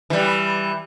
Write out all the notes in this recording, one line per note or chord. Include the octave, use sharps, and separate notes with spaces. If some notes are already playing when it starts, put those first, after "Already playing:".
E3 G3